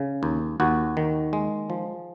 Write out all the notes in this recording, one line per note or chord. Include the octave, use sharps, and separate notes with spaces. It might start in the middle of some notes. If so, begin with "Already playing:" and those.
Already playing: C#3
D#2
D#2 F#4
D#3
G#3
F3